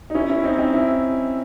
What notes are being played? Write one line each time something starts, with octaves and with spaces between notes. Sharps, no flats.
D#4
C#4 E4
C#4 E4
C4 D#4
C4 D#4
C#4 E4